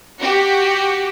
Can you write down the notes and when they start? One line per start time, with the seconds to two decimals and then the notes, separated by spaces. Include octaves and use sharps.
0.19 F#4 G4